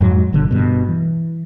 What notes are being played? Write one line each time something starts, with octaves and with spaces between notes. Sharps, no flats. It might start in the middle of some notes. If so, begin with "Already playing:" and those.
F2 G#2 F#3
G1 B2 D3 G3
G2 B2
E3